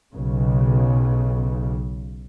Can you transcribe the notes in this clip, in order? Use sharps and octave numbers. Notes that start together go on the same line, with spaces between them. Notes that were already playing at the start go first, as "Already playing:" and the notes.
B1 C#3